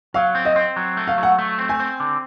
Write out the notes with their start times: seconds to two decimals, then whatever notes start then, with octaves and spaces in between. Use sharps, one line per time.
0.14 F#3 F5
0.35 C4
0.45 D#5
0.56 C4
0.76 F#3
0.97 A3
1.07 F5
1.18 F#3
1.23 F#5
1.38 A3
1.58 C4
1.69 G#5
1.80 C4
2.00 D3